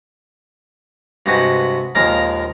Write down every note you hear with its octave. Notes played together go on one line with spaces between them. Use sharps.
G2 C3 G#3 F#4 B4
A#1 D#2 G#3 A#4 F5 A#5